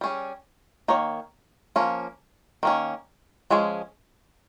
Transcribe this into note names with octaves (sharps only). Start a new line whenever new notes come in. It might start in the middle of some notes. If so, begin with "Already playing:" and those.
G3 C#4 G#4
D#3 A#3 C#5
F3 A#3 C#4
D#3 A#3 C#4
F3 G#3 C#4 G#4